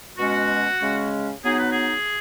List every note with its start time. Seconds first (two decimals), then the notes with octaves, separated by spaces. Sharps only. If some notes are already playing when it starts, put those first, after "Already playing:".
0.17 B2 G#3 C#4 F#4
0.81 C#3 G#3 C#4
1.44 F#3 B3 D#4 G#4
1.58 B4
1.71 G#4